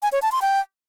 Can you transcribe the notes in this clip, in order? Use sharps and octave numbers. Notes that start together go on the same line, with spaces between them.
G#5
C#5
A5
C6
G5